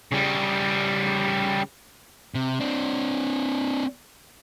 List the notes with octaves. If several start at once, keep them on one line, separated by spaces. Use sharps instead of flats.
C#3 G3
C3
C4 D4